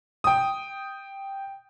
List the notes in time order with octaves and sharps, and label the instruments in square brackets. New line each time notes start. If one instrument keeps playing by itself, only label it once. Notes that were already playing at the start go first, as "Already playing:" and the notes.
[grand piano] G5 D#6